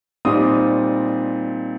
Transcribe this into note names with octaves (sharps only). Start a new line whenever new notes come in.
A#2 G3 C4 D#4 D#6